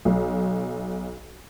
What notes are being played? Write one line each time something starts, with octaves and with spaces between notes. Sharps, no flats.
B1